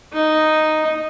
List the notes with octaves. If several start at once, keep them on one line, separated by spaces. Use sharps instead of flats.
D#4